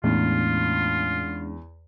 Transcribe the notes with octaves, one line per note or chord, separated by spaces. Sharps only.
E2 A2 G#3 A3 C#4 D4 F4